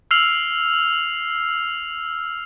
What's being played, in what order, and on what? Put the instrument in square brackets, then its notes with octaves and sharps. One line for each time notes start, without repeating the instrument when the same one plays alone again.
[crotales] E6 F6 C7 F7 F#7